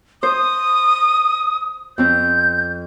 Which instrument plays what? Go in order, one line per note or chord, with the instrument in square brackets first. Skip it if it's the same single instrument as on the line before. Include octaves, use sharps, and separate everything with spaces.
[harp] C5 [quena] D#6
[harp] F2 C4 [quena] G6